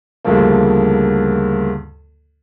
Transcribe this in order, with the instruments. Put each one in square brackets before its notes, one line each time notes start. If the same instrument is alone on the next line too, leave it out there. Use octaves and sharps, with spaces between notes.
[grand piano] D2 G2 C#3 F3 A#3